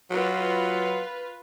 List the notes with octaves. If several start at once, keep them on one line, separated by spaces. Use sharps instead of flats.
F#3 F4 B4